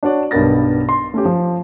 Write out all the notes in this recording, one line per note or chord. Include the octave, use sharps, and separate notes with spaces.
D4 F#4 C#5 D5
B1 G2 B3 A#4 A6 A#6
C6
A3 C#4 G4
F3